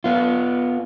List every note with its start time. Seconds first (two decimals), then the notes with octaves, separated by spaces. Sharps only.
0.04 B3 F4